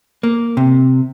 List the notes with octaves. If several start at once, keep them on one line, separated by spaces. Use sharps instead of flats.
A#3
C3